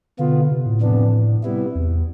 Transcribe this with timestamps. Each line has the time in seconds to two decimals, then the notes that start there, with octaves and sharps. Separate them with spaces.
0.19 B2 D3 B3 F4
0.51 C3
0.66 A2
0.81 F2 C3 E3 B3 D4
1.43 C3 G3 B3 E4
1.75 E2